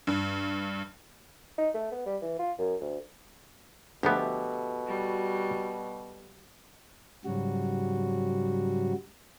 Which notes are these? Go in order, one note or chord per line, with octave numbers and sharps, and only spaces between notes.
G2
D#4
A3
B3
G3
E3
F4
F#2
D2
D2 B2 F3 B3 G4 A4 E5
G3 F#4
G#2 C#3 F#3 G3 F#4